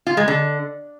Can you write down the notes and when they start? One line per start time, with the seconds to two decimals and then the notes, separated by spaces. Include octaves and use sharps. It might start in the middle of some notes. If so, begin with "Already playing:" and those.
0.07 F4
0.17 G#3
0.28 D3